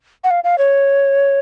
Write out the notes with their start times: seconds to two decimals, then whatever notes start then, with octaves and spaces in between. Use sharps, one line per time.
0.24 F#5
0.31 F5
0.44 F5
0.58 C#5